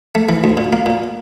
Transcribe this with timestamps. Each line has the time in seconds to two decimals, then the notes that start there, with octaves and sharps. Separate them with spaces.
0.15 A3
0.29 E3
0.44 D2
0.57 A#2
0.73 A#3
0.86 A#2